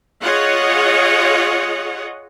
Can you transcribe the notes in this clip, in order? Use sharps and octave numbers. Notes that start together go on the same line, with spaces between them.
F4 G#4 C#5 D#5 F#5